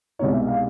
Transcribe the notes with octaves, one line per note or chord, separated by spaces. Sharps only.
C2 B2 G#3 B3 D#4 C#5
E5
F5